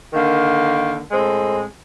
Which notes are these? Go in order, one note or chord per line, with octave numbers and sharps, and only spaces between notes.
D3 D#3 A#3
A2 G#3 C4